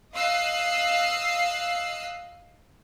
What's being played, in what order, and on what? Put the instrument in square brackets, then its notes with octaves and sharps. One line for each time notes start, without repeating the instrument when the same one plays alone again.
[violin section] D#5 F5 E6 F#6 C7